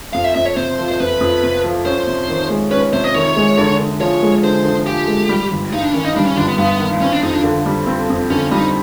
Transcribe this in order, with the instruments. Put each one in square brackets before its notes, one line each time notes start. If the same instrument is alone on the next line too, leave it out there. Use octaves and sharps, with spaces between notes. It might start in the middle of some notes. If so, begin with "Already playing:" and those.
[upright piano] F2 [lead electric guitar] F5
[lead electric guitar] E5
[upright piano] F2 [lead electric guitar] E5
[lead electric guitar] C#5
[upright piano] C3 [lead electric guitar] C5
[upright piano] F3
[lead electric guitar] C5
[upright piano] F2 [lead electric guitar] B4
[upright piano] F2
C3
F3
[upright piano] C#4 [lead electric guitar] C5
[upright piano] C3
D#3
G#3
[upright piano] C#4 [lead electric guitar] B4
[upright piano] C3 [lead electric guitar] C5
[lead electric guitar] D#5
[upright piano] D#3 [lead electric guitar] C#5
[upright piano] G#3
D3
D3
[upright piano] F3 [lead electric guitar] C#5
[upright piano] G#3
[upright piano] D3 [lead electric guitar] C5
[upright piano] D3
[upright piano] F3 [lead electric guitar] G4
[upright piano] G#3
G3
G1
[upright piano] G2 [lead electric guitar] D#4
[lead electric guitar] D4
[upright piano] D#3 [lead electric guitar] C#4
[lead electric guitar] D#4
[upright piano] G3 [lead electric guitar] D4
[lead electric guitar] C#4
[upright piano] G1 [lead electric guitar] D4
[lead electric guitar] B3
[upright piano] G2 [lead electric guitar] B3
[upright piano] D#3
[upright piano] C4 [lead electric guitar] C#4
[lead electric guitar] D4
[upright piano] F2 [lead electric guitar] D#4
[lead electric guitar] D4
[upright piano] D3
G3
C4
F2
[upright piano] D3 [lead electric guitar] C#4
[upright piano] G3 [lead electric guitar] D#4